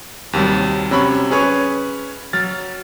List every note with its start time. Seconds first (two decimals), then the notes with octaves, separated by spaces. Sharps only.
0.33 D#2 C3 F#3 G3
0.91 C3 F#3 C#4 C#5 B5 C#6
1.30 C#4 G#4 B4 C#5
2.33 F#3 F6 A6